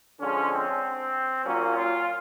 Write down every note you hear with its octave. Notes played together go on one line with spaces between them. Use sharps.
D3 F3 G#3 C#4
C4
A#2 F#3 A#3 C#4
F4